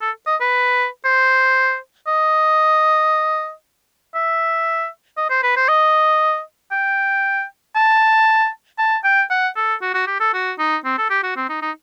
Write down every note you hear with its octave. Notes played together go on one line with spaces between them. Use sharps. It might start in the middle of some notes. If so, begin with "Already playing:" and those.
A4
D#5
B4
C5
D#5
E5
D#5
C5
B4
C5
D#5
G5
A5
A5
G5
F#5
A4
F#4
F#4
G4
A4
F#4
D#4
C4
A4
G4
F#4
C4
D#4
D#4